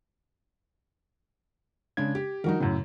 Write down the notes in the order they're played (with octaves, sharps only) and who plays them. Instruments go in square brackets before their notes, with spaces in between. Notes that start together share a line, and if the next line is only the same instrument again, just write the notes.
[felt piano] C#3 G#3 D4 [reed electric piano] G#6
[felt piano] G4
[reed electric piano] D#3 F3 G3 [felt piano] D#4 F#4 A#4
[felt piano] F#2 A2 [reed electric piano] C#3